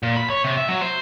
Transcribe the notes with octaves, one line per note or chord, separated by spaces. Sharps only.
A#2
B5
C#5
C3
E5
F#3
C5